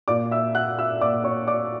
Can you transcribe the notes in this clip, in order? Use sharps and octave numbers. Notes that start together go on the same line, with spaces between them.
A#2 D5 D6
E5 E6
F#5 F#6
E5 E6
A#2 D5 D6
C#5 C#6
D5 D6